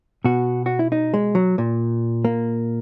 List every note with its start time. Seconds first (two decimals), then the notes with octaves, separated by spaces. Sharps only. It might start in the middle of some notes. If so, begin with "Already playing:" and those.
0.25 B2 F#4
0.66 F#4
0.79 E4
0.92 D#4
1.14 G#3
1.35 F#3
1.58 A#2
2.25 A#3